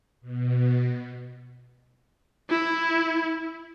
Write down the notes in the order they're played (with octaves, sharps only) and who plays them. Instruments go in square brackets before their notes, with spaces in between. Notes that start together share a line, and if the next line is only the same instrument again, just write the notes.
[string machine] B2
[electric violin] E4